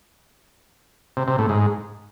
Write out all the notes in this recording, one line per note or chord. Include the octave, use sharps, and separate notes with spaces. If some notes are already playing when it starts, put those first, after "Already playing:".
C3
C3
A2
G#2